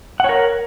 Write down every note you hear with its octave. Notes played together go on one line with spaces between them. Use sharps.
A#4 C#5 F#5